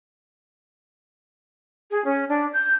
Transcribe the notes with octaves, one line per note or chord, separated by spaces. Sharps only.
G#4
C#4
D4
G6